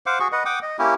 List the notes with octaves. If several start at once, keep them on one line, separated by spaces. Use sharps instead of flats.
C5 F5 F#5 D6
F#4 G#4 C#6
B4 D#5 F#5
F#5 G5 D6 D#6
D#5
A#3 C#4 E4 G4